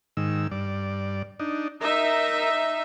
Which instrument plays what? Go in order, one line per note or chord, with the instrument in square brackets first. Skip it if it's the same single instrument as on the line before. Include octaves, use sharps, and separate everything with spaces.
[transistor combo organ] G#2 D#3 E6
G2 D5
D4 D#4
[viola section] D#4 E5 [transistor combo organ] A#4